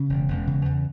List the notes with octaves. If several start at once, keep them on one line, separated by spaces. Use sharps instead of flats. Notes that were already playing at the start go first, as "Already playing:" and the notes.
Already playing: C#3 C#4
E1
E1
C#3
E2